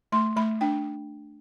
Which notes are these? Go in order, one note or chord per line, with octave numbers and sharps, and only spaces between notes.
A3 C6
A3 B5
D4 G5